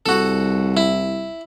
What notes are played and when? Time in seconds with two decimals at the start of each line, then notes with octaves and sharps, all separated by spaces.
0.06 C2 F#4 A4
0.77 E4